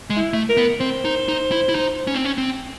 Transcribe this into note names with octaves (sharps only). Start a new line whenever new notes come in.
G#3
E4
A3
A#4
B3
C4 C5
D#4
D#4
E4
E4
D#4
C#4
C4
C#4
C4